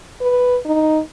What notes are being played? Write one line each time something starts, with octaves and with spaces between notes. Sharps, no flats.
B4
D#4